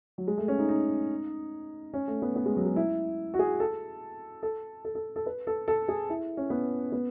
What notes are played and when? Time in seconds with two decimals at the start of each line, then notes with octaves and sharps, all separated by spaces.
0.18 F#3
0.28 G#3
0.38 A3
0.48 C#4
0.59 D#4
0.69 D#4
1.94 C#4
2.08 A3
2.22 B3
2.36 B3
2.46 G#3
2.57 F#3
2.66 G#3
2.76 E4
3.34 F#4
3.39 G#4
3.60 A4
4.43 A4
4.84 A4
4.95 A4
5.16 A4
5.26 B4
5.47 A4
5.68 A4
5.88 G#4
6.10 E4
6.37 C#4
6.50 B3
6.92 B3